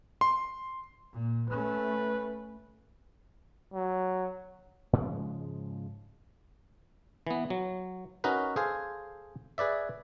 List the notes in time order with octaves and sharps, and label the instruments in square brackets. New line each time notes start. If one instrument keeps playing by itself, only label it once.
[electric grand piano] C6
[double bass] A#2
[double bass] A3 C#4 [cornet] B4
[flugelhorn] F#3
[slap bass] G#2 C#3 F3 G#3
[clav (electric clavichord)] E3 B3
F#3
C#4 D#4 F#4 A#4 B4
G#4 A4 C5 F5 G#5
G#4 B4 D5 E5